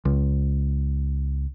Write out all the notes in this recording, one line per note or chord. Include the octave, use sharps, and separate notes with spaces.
C#2